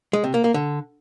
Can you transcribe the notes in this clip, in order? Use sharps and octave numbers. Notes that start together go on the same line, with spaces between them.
G#3
C3
A#3
A#3
D3